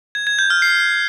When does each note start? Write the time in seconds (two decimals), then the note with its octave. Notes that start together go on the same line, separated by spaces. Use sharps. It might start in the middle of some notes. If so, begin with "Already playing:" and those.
0.15 G#6
0.27 G#6
0.39 G6
0.50 F6
0.62 C7